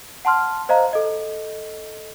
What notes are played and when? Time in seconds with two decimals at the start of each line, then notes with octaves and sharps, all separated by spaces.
0.25 F#5 A5 C6 F6
0.69 C5 D#5 F5 A#5
0.93 A4 D#5